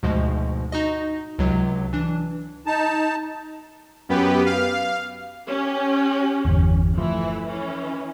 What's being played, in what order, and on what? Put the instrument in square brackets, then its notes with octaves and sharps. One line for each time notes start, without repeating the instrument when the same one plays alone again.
[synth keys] D2 G#2 B2 F3 G#3
D#4 F#4 D#5
C#2 C3 F#3
E3 D4
[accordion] D#4 A5
[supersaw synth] F#2 B3 G4 B4
F5
[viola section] C#4 G4
[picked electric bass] G1 E2
[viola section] E3 A3 E4 [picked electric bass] F3
[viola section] E3 C#4